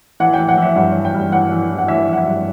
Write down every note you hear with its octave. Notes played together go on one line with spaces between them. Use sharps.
E3 F#5
E3 G5
F#5
E3
E5
G2 F#5
E3
G5
G2
E3 F#5
E3
E3
F#5
E3 E5
E3
F#5
E5
G2